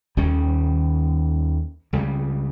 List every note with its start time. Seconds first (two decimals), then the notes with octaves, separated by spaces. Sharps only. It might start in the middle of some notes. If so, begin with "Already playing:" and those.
0.17 D#2 D#3 G3 C#4
1.93 C#2 C#3 G3